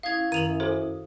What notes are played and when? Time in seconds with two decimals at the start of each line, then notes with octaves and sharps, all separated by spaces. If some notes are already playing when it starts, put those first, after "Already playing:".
0.03 C#4 E4 F5 D#6 G#6
0.32 F#2 D#3 D#7 F7 F#7
0.60 F#4 A4 C5